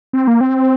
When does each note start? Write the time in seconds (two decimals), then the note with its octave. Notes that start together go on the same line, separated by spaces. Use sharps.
0.13 C4
0.28 A#3
0.41 C4